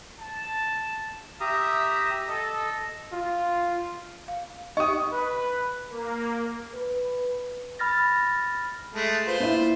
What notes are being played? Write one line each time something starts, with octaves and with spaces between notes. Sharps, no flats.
A5
G4 E5 A#5 D#6
A4 D#5
F4
F5
D#4 G4 D#5 G5 C#6 D#6
B4
A#3
B4
B5 F6 A6 A#6
G#3 A3
F4 B4 C5
A#2 E4